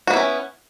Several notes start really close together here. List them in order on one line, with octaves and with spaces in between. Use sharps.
F#4 B3 E4 C#4